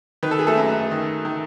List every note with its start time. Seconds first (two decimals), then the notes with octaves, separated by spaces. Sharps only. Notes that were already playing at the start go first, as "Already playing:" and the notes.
0.23 D#3 B4
0.31 A4
0.39 G#4
0.47 A3 A4
0.57 F#2
0.91 D#3
1.25 D#3